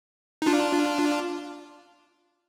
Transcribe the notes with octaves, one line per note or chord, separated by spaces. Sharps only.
D#4
D4 F4